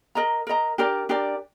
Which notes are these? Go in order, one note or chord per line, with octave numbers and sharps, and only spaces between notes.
A#4 D#5 A#5
A#4 D#5 A#5
D4 G4 A#4 D5
D4 G4 A#4 D5